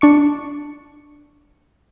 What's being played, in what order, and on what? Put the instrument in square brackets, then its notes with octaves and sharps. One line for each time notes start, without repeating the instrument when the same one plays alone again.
[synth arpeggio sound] D4 C#6 C#7